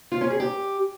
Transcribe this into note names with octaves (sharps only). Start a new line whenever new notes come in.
F4
C#4
G#4
G4